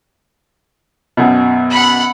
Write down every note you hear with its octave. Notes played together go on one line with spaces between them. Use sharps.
F#2 B2
F#5 B5